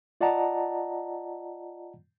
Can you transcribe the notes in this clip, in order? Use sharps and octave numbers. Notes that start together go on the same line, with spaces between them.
F4 D5 D#5 F#5 A5 A#5